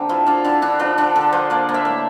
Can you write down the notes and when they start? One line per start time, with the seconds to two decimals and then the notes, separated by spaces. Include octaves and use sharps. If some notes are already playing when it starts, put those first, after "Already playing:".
Already playing: D3 A#3 C4 D4 G4
0.09 F3 E4
0.26 D3 F4
0.45 D3 E4
0.62 D3 D4
0.79 F3 D4
0.98 D3 D4
1.16 D3 A4
1.33 F3 C5
1.50 A#3 D5
1.69 A#3
1.74 E5
1.85 A2